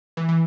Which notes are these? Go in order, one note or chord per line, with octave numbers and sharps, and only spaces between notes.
E3
E3